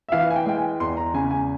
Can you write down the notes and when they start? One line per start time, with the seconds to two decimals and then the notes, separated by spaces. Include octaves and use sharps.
0.09 E5
0.12 E3 F5
0.30 G#5
0.36 G5
0.46 G#3 G5
0.58 G#5
0.80 E2 C6
0.97 A#5
1.14 C#3 G#5
1.31 G#5